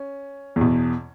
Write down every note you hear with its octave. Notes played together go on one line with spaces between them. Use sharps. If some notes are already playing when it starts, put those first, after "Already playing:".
Already playing: C#4
E2 B2